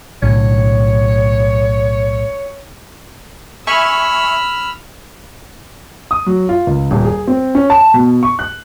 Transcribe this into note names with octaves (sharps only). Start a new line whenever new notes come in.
B1 A2 D3 C#5
E5 G#5 B5 C#6 E6 F6
D#6
F#3
F4
C#2
D#1
G#4
C4
C#4
A5
B2
C#6
F#6